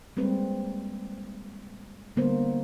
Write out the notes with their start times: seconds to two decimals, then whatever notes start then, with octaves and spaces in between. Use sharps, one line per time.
0.17 G3 G#3 A#3 C4 B4
2.16 D3 G3 A#3 B3 C5